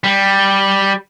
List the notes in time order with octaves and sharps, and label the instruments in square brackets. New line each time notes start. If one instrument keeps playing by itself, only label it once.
[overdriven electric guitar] G3